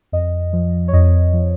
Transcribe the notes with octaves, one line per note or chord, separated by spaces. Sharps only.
F2 D#5
F3
C#5
F2 D#5
F3